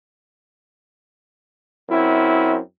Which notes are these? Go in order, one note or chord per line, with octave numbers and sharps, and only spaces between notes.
F#2 C4 E4